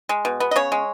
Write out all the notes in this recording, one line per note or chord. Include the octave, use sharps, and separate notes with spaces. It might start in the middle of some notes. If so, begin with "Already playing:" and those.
G#3
B2
B3
D#5
C#3 C#5
G#3